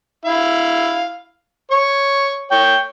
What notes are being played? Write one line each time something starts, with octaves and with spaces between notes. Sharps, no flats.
E4 F5
C#5 C#6
C#5 G5